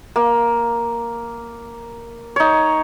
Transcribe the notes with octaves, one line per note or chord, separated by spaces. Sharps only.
A#3
D#4 C#5